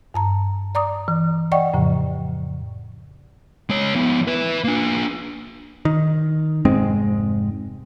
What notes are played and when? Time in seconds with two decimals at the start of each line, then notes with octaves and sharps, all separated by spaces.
0.14 G2 A5 A#5
0.75 D5 A#5 D6 D#6
1.08 E3
1.52 D5 D#5 F#5 G5 C#6
1.73 F2 A2 C#3 F3
3.70 G#3 C#5
3.95 F3 B3
4.28 B4 E5
4.64 A#3 D4
5.85 D#3
6.65 F1 G#2 G#3 C4